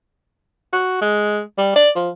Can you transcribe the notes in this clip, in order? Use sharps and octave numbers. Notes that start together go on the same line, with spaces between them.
F#4
G#3
G3
D5
F3